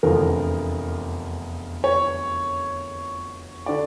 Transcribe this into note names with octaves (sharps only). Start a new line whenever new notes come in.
F1 E2 D3 F3 A#4
C#5
D3 D5